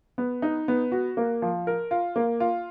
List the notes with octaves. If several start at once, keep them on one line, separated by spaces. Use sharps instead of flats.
B3
D#4
B3
F#4
A#3
F3
A#4
F4
A#3
F4